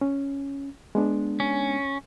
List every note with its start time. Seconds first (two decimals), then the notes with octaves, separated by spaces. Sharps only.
0.01 C#4
0.95 G#3 B3 D4
1.40 C#4